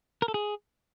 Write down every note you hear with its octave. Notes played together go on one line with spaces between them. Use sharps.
A#4
A4
G#4